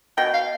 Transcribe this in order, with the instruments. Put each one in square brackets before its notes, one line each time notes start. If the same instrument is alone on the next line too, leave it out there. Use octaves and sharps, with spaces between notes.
[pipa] B2 [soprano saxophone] G5
[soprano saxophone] F5